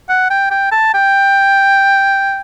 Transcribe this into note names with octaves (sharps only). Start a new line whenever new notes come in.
F#5
G5
G5
A5
G5